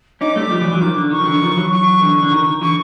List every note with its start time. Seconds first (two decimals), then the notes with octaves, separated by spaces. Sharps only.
0.21 C#4 D#4 D6
0.36 G3 A3
0.51 F3 G3
0.61 E3 F#3
0.71 E3 F#3
0.81 D#3 F3
0.96 D3
1.11 D#3 C#6
1.20 F3
1.26 D3 E3
1.42 D#3 F3
1.57 E3 F#3
1.72 C#6
2.01 D3 E3
2.22 D3
2.32 D#3
2.47 D#3
2.61 D3 E3 C#6